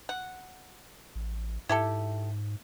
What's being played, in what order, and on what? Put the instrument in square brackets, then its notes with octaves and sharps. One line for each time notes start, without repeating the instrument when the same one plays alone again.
[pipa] F#5
[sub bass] A1
[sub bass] G#2 [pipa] E4 G4 A4